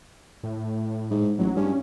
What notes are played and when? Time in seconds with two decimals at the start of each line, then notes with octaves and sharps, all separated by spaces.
0.43 A2
1.11 G#2
1.39 A1 F#3
1.57 G2 C#4